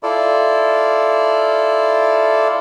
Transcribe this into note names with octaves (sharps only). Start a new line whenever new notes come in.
E4 F4 A4 D5